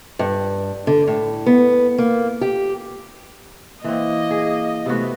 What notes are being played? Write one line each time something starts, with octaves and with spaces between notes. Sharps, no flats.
G2
D3
A2
B3
A#3
G4
E3 A#3 C4 D#5
G#4
C3 A3 B3 F#4